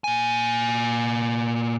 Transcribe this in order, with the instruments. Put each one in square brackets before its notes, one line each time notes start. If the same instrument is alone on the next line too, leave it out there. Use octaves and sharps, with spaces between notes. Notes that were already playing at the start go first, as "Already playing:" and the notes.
[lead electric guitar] A#2 G#5